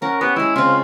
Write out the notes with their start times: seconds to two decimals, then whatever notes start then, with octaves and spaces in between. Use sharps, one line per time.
0.02 C#4 A#4 F#5
0.21 B3 G4
0.36 G#3 E4 G#4
0.56 C#3 C4 F4